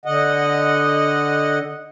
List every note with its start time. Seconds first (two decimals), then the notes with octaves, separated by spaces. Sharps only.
0.06 D3 D#5 F#5